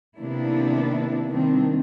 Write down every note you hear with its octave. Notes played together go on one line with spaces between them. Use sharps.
C3 D#3 A#3 B3 D4 E4
C3 D#3 G3 A#3 C4 D4